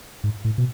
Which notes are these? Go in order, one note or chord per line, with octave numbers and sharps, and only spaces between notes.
G#2
A2
B2